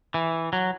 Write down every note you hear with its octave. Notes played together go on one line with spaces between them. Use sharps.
E3
F#3